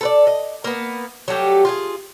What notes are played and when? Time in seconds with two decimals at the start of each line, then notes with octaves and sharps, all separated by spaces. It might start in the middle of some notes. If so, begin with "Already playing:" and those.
0.01 A4 B4 D5
0.27 D#5
0.64 A#3 B3
1.28 F#3 G3 A3 G4
1.65 F4 G4 G#4